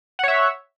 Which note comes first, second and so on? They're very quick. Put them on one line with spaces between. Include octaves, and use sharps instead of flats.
F#5 C#5 E5